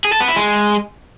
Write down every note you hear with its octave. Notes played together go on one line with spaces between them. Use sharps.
G#4
A4
B3
E4
G#3